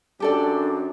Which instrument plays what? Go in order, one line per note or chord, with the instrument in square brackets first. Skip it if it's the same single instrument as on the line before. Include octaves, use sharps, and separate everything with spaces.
[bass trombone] F#2 [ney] D4 [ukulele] G4 A4 D5